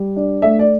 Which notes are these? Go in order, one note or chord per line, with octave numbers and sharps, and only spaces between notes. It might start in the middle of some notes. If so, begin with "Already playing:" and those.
Already playing: G3
D4
A3 E5
D5